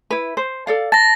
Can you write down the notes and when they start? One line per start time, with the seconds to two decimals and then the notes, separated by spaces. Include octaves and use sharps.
0.10 E4 B4
0.37 C5
0.67 A4 D5 F5
0.92 A5 A6 A#6